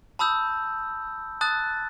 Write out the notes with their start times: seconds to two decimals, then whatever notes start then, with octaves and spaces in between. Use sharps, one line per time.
0.19 A5 B5 D#6 E6 G6
1.41 A5 D#6 F#6 A6